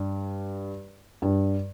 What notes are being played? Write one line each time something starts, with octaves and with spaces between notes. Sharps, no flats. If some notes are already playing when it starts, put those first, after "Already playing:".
Already playing: G2
G2